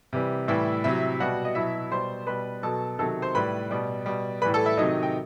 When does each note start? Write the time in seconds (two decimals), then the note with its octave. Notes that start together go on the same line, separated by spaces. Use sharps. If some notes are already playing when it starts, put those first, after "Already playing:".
0.13 C3 E3 G3
0.48 A2 E3 G3 E4 E5
0.84 C3 F#3 E4 E5
1.20 B2 G3 F#4 F#5
1.45 D#5
1.55 B2 F#3 E4 E5
1.91 B2 G3 C5 C6
2.27 B2 G3 B4 B5
2.63 B2 F#3 A4 A5
2.99 C3 D#3 F#3 A4 A5
3.22 C5 C6
3.35 A2 G3 B4 B5
3.71 B2 G3
4.06 B2 G3
4.42 A2 E3 G3 B4 B5
4.54 A4 A5
4.66 E4 E5
4.77 C3 D#3 F#3 D#4 D#5
5.03 G5